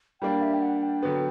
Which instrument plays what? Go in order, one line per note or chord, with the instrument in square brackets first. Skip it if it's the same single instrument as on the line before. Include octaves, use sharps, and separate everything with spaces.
[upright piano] G3 A#3 D4 [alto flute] G5
[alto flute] E5
G5
F#5
G5
[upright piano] D3 F#3 B3